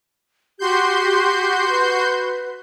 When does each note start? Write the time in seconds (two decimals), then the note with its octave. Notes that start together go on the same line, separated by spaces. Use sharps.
0.59 F#4 G4 C6 G6
1.69 B4